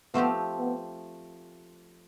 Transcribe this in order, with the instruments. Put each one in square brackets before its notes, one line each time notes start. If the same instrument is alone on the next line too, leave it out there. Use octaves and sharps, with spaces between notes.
[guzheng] F3 A3 C4 G4 [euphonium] B3
[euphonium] B3